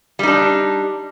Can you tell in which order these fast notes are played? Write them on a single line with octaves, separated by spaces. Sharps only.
G3 D#4 D4